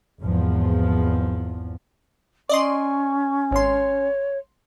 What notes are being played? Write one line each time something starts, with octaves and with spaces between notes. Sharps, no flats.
G#1 E2 F3
C#4 D5 D#5 C6 C#6
G#1 C#5 C6